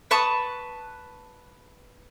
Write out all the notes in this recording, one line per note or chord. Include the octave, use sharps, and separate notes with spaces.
B4 A5 C#6 D#6